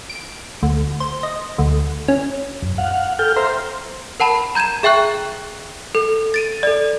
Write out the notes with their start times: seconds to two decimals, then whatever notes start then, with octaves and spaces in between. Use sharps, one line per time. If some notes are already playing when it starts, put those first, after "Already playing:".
0.10 D7
0.63 D2
1.00 C5
1.23 D#5
1.58 D2
2.08 C#4
2.62 F#2
2.78 F5 F#5
3.19 A4 G5 F6 G6
3.36 C5 E5 F5 A#5 C6
4.20 A#4 F#5 A5 B5
4.55 A#5 G6 G#6 D#7 E7
4.83 G#4 E5 G5 C#6 F#6
5.95 A4
6.34 A6 D7 D#7
6.63 A4 D5